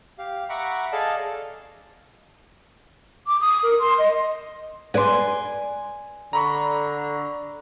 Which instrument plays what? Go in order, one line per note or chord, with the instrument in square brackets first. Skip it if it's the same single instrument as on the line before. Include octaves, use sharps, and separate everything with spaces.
[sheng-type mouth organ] G4 F5
E5 F#5 A#5 B5 C#6 D6
G#4 A4 D5 D#5 F5 A5
[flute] D6
D#6
A#4
C6
D#5
[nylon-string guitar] B4 D5 [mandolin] G#5 C6
[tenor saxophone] D3 [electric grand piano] A#5 B5 C#6